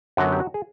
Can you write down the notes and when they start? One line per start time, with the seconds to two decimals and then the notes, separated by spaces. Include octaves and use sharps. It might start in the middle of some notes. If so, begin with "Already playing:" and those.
0.17 F#2 D3 F#3 B3 F#4
0.32 G4
0.40 F#4
0.54 G#4